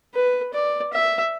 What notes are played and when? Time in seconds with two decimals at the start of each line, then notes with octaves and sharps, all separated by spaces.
0.14 B4
0.54 D5
0.93 E5